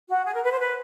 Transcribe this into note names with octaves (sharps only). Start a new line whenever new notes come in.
F#4
G#4
A#4
B4
C5
B4